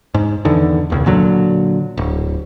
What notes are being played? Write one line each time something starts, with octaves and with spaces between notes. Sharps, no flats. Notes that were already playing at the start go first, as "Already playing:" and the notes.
G#2
E2 D3 D#3
E1 C#2
A#2 D3 F#3
D1